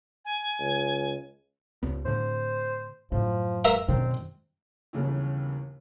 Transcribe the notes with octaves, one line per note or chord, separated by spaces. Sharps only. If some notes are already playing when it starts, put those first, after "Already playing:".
G#5
C#2
C#2 B3
A2 D3 C5
F#2 A2 F3
A#4 E5 F5
F#2 B2 D#3 C4
G1 D#2 C#3 E3